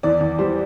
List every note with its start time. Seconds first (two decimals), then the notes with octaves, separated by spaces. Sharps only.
0.03 E2 D5
0.21 E2
0.39 G3 C5